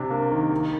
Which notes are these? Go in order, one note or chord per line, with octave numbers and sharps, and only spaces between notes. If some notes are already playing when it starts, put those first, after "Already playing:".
Already playing: C3 D4
A#3
D#3
D#3